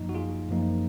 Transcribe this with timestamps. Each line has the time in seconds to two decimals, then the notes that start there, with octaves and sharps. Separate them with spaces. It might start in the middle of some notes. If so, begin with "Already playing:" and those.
Already playing: F#2 F3 A#3 D#4
0.09 F#4
0.15 F4 G#4
0.49 F#2 F3 A#3 D#4